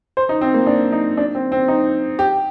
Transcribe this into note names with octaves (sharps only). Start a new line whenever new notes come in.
C5
D#4
C4
A#3
D4
D#4
D4
C4
C4
D#4
G4